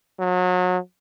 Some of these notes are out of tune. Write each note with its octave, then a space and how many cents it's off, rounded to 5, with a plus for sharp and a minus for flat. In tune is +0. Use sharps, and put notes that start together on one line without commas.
F#3 -30